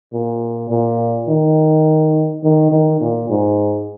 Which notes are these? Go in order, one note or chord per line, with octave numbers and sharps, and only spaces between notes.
A#2
A#2
D#3
D#3
D#3
A#2
G#2